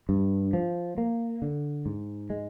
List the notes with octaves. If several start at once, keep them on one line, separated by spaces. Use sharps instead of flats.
G2
F3
A#3
D3
G#2
G#3